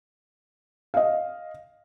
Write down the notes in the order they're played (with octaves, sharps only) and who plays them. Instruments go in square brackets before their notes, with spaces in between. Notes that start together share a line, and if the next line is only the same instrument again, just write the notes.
[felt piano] D#5 F5